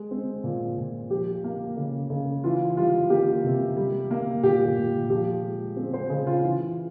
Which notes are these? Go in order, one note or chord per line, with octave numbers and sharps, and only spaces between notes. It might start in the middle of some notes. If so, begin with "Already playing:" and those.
Already playing: G#3
C4
A#2
A#2
F3 G4
A#3
C#3
C#3
E3 F4
G3 F4
A#3 G4
C3
G3
A#3
A#2 G4
A#2
F3 G4
G#3
C4 G#4
C5
C#3 G#4
F4
E3